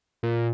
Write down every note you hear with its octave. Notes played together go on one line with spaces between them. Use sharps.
A#2